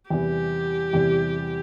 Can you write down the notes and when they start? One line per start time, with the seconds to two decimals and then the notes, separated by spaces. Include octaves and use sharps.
0.10 E2 C3 E3 G3 G4
0.93 E2 C3 E3 G3